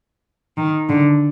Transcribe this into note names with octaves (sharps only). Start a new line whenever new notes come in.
D#3
D3